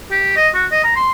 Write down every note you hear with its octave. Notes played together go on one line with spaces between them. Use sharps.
G4
D#5
F#4
D#5
A#5
C6